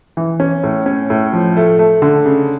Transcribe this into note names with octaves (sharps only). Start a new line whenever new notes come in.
E3
C#4
A2
C#4
A2
F3
A3
A3
D3
C#3